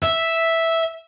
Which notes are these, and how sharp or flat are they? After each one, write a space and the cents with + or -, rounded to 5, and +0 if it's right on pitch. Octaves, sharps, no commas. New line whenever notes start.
E5 -5